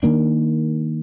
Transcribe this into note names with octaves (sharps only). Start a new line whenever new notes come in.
D#3 A#3 D4